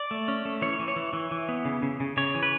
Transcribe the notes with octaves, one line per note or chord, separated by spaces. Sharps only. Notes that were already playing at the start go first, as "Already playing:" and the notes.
Already playing: D5
A3
C#4
A3
E3 C#5
E3
C#5
E3
E3
E3
B3
C#3
C#3
C#3
C#3 C#5
E3
B4